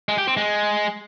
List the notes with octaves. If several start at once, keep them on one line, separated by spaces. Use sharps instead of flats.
G#3
G4
C4
G#3